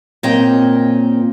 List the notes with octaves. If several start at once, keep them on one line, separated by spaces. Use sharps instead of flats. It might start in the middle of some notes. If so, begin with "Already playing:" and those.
A#2 C4 C#5 D#5 G5